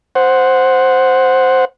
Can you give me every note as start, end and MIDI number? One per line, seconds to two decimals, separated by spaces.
0.15 1.65 72
0.15 1.65 78